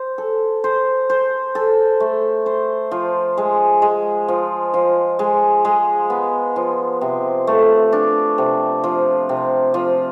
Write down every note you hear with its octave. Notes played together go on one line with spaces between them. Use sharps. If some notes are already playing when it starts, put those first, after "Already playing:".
Already playing: C5
A4
C5
C5
A4
A3
C5
F3
G#3
G#3
F3
F3
G#3
G#3
B3
F3
C3
A3
D4
C3
F3
C3
F3